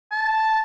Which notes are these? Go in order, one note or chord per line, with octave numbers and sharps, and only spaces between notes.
A5